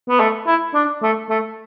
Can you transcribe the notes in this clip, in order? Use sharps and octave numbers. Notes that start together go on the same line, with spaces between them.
B3
A3
E4
D4
A3
A3